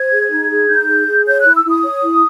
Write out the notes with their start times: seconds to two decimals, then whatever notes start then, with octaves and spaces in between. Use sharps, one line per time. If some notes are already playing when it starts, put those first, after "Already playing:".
Already playing: C5 G#6
0.12 G#4
0.31 D#4
0.50 G#4
0.69 D#4 G6
0.88 G#4
1.07 G#4
1.26 C#5 G6
1.41 E4 F#6
1.55 E6
1.64 E4 D#6
1.84 C#5
2.02 E4